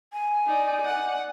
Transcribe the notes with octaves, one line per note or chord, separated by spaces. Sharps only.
G#5
D#4 D5
D5 F#5